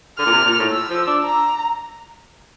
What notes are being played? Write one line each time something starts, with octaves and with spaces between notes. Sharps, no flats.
D3 F6
A#2
C3
A#2
A2
E6
F3
D4
A#5